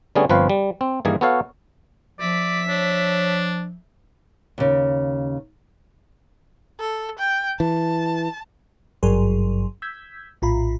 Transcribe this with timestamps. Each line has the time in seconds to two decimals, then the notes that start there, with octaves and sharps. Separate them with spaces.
0.15 D3 G3 A3 B3 C#4 G#4
0.29 G1 F3 C4 B4 C#5 F5
0.50 G3
0.81 C4
1.05 G2 D#3 E3 A#3 G#4 G#5
1.21 B3 F#4 A4 C#5 F5
2.20 F3 D5 E5 B6
2.68 D4 C#5
4.58 D#2 C#3
6.80 A4
7.19 G5
7.60 E3 A5
9.03 G#1 G2 F#3 G#4 A#4 C6
9.82 E6 G6 G#6 B6
10.42 A#1 A2 F4 A#5 B5